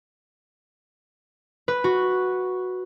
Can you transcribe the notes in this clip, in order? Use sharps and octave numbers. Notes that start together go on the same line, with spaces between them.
B4
F#4